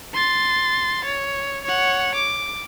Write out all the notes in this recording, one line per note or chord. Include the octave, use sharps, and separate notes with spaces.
C6 A6
C#5
C#5 F#5
D6